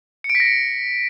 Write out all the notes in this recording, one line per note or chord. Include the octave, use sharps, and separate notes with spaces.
C#7
D7
B6
A#6
C#7